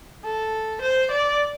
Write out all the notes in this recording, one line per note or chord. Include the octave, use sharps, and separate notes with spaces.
A4
C5
D5